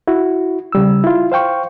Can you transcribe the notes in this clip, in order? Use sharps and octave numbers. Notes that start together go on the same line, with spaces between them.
E4 F#4
C#3 G3 E6
E4 F4
C5 F5 G5 C#6